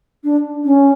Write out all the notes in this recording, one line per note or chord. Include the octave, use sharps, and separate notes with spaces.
D4
C#4